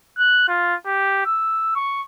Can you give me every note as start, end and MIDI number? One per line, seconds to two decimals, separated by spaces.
0.19 0.46 90
0.48 0.75 65
0.86 1.23 67
1.26 1.71 88
1.76 2.03 85